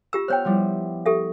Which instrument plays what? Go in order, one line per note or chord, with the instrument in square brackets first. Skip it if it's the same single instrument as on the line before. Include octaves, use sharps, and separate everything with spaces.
[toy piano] F4 G4 E6 [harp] E7
[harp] B3 F6 [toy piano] C5 C#5 G5
[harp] F3 G3 E4
[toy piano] G4 A4 E5